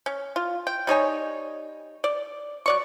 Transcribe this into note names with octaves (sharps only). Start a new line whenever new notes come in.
C#4
F4
G5
G3 D#4 C#5 G#5
D5
F#3 D5 C#6